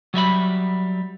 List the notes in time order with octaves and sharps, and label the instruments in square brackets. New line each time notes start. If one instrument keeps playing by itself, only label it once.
[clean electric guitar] F#3 G3 E5 B5